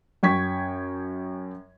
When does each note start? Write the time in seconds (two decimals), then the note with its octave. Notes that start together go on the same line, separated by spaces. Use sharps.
0.23 F#2 G5 C#6 G#6 B6